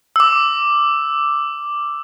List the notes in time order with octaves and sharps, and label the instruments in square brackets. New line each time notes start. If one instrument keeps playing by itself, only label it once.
[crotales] D6 E6